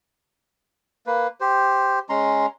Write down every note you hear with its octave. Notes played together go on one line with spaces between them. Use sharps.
A#3 B4
G4 C5
G#3 C#4 A#5 C6